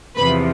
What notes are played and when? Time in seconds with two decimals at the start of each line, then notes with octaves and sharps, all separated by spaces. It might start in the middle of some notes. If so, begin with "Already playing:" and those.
0.17 E2 C3 F3 B4 B5